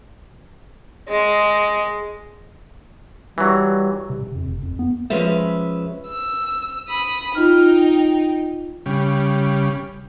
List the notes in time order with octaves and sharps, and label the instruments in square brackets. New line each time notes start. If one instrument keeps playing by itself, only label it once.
[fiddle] G#3
[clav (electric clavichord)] E3 F#3 [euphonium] G3
[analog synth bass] C3
C3
F2
F#1
F2
B3
[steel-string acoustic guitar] F3 G#3 C#4 B4 E5
[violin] E6
B5 D#6
[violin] D#4 G5 [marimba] F4 F6
[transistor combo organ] C#3 G3